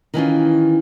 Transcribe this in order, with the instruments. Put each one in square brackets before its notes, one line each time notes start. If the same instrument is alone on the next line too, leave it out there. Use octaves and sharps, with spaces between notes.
[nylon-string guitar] D#3 E3 C#4 F4